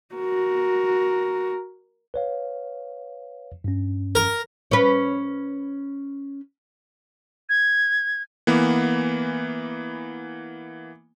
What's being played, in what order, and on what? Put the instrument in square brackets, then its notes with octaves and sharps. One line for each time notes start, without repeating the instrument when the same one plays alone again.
[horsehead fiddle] F#4 A#4
[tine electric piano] B4 C#5 F5
G2 C#4
[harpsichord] A#4
[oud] C#4 B4
[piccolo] G#6
[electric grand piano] E3 A#3 B3